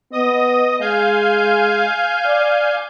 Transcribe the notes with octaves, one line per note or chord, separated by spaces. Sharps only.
B3 D#5 D#6
G#3 F5 G#5 G6
D5